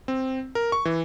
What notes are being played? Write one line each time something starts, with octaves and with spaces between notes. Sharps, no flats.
C4
A#4
C#6
E3